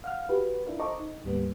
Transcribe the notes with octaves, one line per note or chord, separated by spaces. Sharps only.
F5 F#5 F6
F#4 G4 B4
D4 E4 F4 A#4
A4 C5 D#5 A#5 C#6 D6
D#4
D2 G#2 G3 A#3 B3